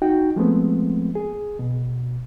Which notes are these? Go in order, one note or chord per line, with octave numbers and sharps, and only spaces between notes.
D#4 F#4 G5
F3 G#3 A3 B3 C4
G#4
B2